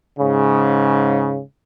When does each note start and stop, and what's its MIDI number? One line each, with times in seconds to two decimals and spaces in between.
0.19 1.42 44
0.19 1.42 49